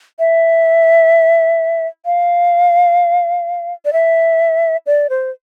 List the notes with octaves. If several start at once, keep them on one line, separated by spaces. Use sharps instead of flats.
E5
F5
D5
E5
D5
C5